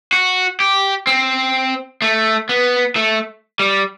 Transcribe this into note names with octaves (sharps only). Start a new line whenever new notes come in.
F#4
G4
C4
A3
B3
A3
G3